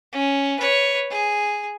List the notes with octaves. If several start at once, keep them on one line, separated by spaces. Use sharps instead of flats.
C#4
B4 C#5
G#4